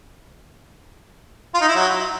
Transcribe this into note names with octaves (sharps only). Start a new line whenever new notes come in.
F4
D#4
E4
F#3